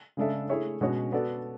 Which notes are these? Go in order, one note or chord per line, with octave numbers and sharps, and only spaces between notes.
C#3 G#3 D4 A4 E5
A3 E4 G#4 C#5 E5
B2 G#3 C#4 F#4 C#5
B3 F#4 A4 D5